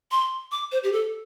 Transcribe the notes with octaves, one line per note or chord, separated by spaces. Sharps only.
C6
D6
C5
G4
A4